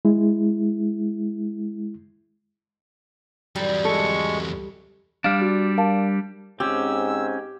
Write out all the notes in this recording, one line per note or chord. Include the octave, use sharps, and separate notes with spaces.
G#3 E4
E2 F#3 G3
G#3 A4 C#6
G3 D4 F5 F6
F#4
A#4 F5 A5
G#2 C4 C#4 G4 E6